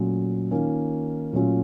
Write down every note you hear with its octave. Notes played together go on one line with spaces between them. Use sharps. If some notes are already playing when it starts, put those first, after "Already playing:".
Already playing: A#2 F#3 A3 C#4
D#3 A#3 C#4 F4
A#2 F#3 A3 C#4 F4